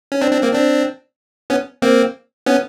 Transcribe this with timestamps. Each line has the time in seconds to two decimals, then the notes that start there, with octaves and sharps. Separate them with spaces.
0.12 C#4
0.21 C4 D4
0.32 C4 D4
0.43 A#3 C4
0.53 C4 D4
1.50 B3 C#4
1.82 A#3 C4
2.46 B3 C#4